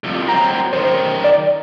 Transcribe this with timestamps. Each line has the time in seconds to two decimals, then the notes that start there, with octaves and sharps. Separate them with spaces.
0.04 C2 F2
0.28 F#3 C4 A#5
0.73 F#2 D#3 C5
1.24 D5